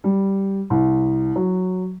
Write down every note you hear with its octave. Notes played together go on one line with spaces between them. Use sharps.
G3
C2
F#3